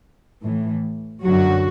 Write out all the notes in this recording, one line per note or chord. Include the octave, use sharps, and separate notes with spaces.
A2 E3
F#2 D3 F#3 F#4